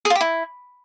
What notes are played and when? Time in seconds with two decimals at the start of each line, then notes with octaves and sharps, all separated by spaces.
0.05 G#4
0.10 F4
0.15 G4
0.21 E4